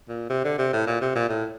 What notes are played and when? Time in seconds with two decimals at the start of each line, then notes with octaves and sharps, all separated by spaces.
0.08 A#2
0.30 C3
0.44 D3
0.58 C3
0.73 A2
0.87 A#2
1.01 C3
1.15 A#2
1.29 A2